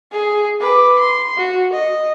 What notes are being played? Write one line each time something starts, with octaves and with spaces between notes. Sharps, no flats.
G#4
B4 D6
C6
F#4
D#5